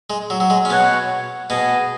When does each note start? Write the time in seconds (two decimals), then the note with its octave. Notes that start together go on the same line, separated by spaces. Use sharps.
0.10 G#3
0.30 F#3
0.40 F#3
0.50 G#3
0.65 C#4
0.70 B2 B3 F#4 C#5 F#5
1.50 B2 B3 G#4 D#5 G#5